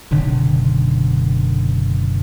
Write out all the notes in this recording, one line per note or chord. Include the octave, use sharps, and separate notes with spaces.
F#1 B2 D3 D#3